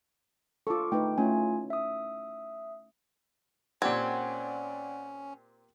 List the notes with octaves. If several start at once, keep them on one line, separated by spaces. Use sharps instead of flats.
F4 A4 C#6 D6
A3 D#4 B4 G5
A3 C#4 E4 F4 G#5
E5 D#6
A#2 C4 C#4 G4 A#4 D5 F#5 G#6